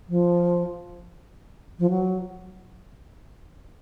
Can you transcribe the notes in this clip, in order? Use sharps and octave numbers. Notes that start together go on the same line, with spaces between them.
F3
F3
F#3